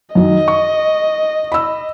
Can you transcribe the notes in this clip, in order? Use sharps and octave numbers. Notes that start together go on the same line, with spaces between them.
F#2 D#3 F#3 D#5
C#6
B5 E6